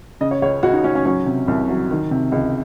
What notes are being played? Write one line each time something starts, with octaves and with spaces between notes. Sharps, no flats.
C#3 D#5
C#5
C#2 C#5
C#2 F#4
D#4
C#3 C#4
C#4
F#3 C#4
C3
C2
F#3
D#3
C3
C#2